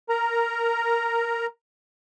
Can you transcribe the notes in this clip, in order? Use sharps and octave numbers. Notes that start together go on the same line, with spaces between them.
A#4 A#5